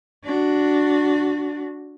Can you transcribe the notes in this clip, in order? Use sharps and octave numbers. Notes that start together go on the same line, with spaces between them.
D4 F#4